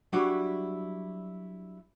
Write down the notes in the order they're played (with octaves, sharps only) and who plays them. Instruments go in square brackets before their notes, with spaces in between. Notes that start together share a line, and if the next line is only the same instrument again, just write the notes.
[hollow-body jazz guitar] F#3 G3 D4 E4 F#4 C#5